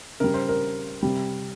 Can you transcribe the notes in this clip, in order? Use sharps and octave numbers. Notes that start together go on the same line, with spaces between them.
C#3 G3 A#4
C5
A#4
C3 G3